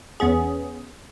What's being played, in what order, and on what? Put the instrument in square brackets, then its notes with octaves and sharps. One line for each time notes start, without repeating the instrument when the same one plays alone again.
[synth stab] E2 B3 C#4 G#4